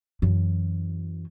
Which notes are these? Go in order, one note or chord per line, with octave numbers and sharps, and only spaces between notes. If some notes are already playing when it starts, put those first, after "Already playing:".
F#2 E3